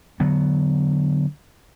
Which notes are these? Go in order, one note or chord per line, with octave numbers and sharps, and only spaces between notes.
D3 F#3 B3